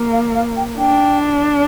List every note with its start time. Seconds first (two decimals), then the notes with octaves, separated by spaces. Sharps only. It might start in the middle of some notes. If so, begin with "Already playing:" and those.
Already playing: A#3
0.13 F5
0.35 F5
0.57 G5
0.78 D4 G5